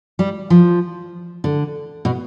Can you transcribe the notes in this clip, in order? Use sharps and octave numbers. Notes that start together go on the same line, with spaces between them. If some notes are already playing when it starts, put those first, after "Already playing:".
G3
F3
D3
B2